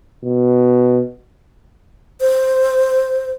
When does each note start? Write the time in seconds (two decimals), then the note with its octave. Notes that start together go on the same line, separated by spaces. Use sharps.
0.23 B2
2.21 C5